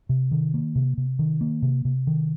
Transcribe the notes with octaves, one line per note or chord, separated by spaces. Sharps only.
C3
D#3
A#3
C3
C3
D#3
A#3
C3
C3
D#3